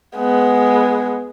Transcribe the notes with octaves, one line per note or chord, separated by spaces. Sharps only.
G#3 B3